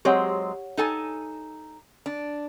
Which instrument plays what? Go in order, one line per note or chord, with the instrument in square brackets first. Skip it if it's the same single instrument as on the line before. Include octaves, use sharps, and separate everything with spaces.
[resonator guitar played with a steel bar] F#3 G#3 C4 [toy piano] G4 C#5 F#5
[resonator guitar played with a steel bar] D#4 A4 G#5
D4